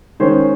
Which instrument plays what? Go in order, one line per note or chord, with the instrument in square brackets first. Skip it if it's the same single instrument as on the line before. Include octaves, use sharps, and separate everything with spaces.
[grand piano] D#3 G#3 C#4 C5